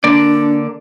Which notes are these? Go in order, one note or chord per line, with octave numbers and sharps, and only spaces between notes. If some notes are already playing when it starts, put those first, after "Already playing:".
D3 A#3 D4 D5